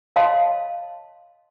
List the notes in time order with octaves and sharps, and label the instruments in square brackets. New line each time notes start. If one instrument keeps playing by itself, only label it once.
[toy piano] C#5 D#5 F5 A5 C6